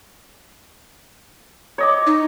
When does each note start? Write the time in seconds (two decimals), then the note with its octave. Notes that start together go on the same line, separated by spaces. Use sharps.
1.78 C#5 D#5 D6
2.06 D#4